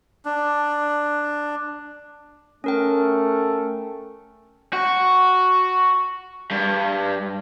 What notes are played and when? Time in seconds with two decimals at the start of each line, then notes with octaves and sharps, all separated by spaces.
0.25 D4
2.64 A3 C#4 A#4 G5
4.73 F#4
6.51 G2